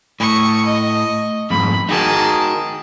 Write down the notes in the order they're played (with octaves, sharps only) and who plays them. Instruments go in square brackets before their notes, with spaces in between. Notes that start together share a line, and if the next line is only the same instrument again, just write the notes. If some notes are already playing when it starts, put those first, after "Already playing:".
[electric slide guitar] A2 [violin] C#6 D#6
[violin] D#5
[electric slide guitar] F2 G#2 [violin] B5
[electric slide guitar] D#4 F#4 A#4 [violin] G#4 A5